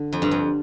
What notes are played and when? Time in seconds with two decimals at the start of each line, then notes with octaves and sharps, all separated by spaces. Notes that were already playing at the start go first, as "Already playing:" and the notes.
Already playing: D3
0.13 F2
0.22 G2
0.31 F2